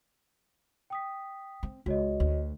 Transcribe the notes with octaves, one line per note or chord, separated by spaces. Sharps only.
G5 D#6 B6
C4
C#2 F#4 C#5 D#5
D2